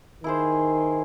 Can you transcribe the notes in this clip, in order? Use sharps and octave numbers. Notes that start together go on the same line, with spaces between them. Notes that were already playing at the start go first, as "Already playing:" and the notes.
D#3 E4 G#4 C5